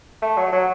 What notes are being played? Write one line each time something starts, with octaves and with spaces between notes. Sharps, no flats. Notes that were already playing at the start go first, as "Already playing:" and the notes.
A3
F#3
F#3